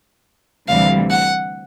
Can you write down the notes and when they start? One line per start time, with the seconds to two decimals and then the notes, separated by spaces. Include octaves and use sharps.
0.68 D2 C3 E3 G3 F5
1.11 F#5